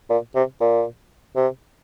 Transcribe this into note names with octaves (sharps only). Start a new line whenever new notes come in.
A#2
C3
A#2
C3